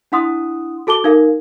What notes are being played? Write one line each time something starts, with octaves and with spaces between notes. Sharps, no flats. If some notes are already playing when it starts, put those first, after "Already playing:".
D4 E4 F#5 C6 D#6
F#4 A4 A5 D6 G7
D#4 A#4 F5